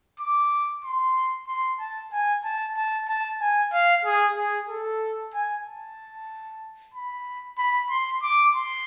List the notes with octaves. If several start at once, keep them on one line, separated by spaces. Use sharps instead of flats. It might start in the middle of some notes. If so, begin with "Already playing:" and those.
D6
C6
C6
A5
G#5
A5
A5
A5
G#5
F5
G#4
G#4
A4
G#5
A5
B5
B5
C6
D6
C6